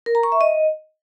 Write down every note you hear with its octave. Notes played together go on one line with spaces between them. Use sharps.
A#4
A#5
C#6
E5
D#5